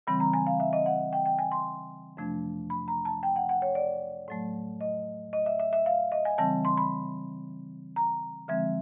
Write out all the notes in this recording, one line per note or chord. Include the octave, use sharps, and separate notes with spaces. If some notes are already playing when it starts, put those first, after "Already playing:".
C#3 E3 G3 C4 B5
A#5
G#5
F5
E5
D#5
F#5
G5
G5
G#5
C6
F2 C3 F3 A3 D4
B5
A#5
A5
G5
F#5
F#5
C#5
D5
A2 F#3 A3
D#5
D#5
E5
E5
E5
F5
D#5
G#5
C#3 E3 G3 C4 A5
C6
B5
A#5
D3 F3 G#3 C4 E5